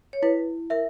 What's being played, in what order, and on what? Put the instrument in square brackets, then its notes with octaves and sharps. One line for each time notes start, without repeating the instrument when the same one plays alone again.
[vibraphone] C#5
[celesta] E4 [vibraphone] B4
[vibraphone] A#4 [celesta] E5